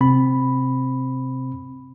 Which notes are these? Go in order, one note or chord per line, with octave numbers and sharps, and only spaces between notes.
C3 C4 B5